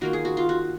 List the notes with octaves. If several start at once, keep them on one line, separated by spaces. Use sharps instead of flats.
D#3 A#3 F4 F#4
G#4
F#4
F4
F#4